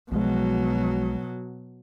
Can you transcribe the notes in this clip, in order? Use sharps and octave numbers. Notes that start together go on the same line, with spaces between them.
B1 B2 F3 F#3 G#3